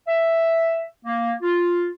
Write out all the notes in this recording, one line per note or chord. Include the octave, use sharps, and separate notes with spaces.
E5
A#3
F4